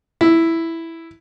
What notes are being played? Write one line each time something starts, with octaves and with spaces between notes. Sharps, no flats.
E4